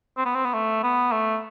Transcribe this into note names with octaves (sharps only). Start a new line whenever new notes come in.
C4
B3
C4
B3
A3
B3
A3